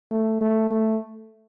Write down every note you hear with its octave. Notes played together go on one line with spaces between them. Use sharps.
A3
A3
A3